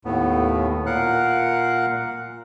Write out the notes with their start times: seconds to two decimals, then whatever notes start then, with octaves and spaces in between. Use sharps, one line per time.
0.05 D#2 A2 B3
0.86 A#2 A#4 F5 F#5 F#6